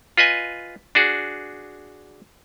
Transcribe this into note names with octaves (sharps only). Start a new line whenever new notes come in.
F4 B4 D#5 G#5
D4 F#4 G#4